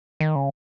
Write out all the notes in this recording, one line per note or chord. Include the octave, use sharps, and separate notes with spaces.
D#3
C#3